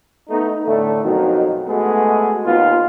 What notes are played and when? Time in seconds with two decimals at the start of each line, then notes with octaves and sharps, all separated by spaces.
0.29 A3 B3 D#4
0.66 A2 D3 A3
1.03 F2 B2 D#3 F#3 D#4
1.68 G#3 A3 B3 F#4 G#4
2.46 D#2 B3 F4